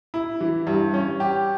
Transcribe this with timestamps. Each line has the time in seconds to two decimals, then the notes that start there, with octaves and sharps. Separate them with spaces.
0.14 E4
0.41 E3
0.67 G2
0.94 C#4
1.20 G4